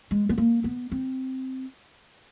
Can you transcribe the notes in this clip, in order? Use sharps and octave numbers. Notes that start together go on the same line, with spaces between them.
G#3
B3
A#3
B3
C4